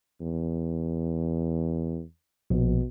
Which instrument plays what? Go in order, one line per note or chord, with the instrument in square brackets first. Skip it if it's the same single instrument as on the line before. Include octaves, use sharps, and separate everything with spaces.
[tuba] E2
[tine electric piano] A#1 [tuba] B2